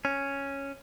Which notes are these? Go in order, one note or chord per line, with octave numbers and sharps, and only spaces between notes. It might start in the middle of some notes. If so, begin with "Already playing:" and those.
C#4